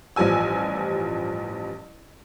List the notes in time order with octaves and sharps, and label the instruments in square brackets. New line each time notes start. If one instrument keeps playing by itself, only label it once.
[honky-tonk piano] A1 G2 F3 G3 G#5 E6